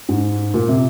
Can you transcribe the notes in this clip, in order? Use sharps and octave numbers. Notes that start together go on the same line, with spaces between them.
G#2
A#2
C3